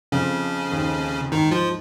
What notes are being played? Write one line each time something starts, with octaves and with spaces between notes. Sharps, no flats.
F2 C#3 F3 C#4
D#2 D#3
G#2 D#3 D#4
F3 F4